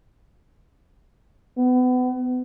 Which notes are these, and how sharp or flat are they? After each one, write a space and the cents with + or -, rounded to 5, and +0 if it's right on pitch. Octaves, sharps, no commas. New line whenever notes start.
B3 +30